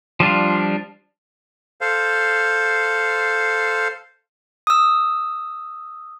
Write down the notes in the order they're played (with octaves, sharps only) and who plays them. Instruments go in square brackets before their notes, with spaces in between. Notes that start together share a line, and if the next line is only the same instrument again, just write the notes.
[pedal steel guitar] F3 G3 D4 F4
[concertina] A4 C5 F5
[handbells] D#6 E6